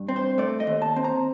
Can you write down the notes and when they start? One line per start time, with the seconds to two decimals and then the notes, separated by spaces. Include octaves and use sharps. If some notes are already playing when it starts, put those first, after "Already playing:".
Already playing: G2
0.08 C4
0.16 C5
0.38 A3 D5
0.60 D#5
0.67 D#2
0.82 A5
0.96 C4
1.04 A#5